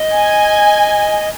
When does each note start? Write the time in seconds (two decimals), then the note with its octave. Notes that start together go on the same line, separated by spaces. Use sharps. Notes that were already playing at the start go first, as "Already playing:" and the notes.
Already playing: D#5
0.13 G#5